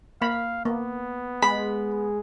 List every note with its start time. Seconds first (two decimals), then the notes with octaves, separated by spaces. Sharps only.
0.22 A#3 F5 B5
0.65 A#3 B3
1.42 G#3 B5